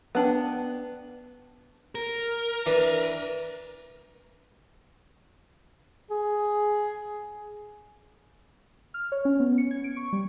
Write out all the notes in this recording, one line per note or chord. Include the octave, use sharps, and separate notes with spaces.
B3 D4 G5
A#4
E3 D4 B4
G#4
F6
C#5
C#4
B3
C#7
G#6
D7
C#6
G3